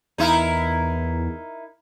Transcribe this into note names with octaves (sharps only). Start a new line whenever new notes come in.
E2 D#4 E4 A#4